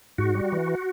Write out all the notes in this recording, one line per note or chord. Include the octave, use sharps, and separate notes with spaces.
G#2 F#4
G3
E3